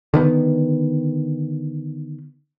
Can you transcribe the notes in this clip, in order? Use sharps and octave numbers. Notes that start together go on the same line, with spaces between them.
D3 D#3 B3